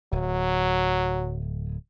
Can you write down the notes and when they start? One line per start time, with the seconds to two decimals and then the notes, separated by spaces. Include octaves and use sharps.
0.12 D1 F#3